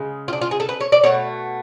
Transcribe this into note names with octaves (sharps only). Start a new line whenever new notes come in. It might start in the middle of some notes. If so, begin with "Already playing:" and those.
Already playing: C#3 G#3
F4
D4
F4
G#4
A4
B4
C#5
D5
B2 A3 C#5